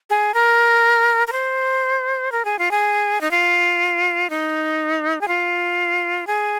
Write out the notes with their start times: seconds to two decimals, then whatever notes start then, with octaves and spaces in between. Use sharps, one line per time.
0.10 G#4
0.34 A#4
1.28 A#4
1.32 C5
2.32 A#4
2.45 G#4
2.59 F4
2.71 G#4
3.21 D#4
3.31 F4
4.30 D#4
5.21 G#4
5.28 F4
6.27 G#4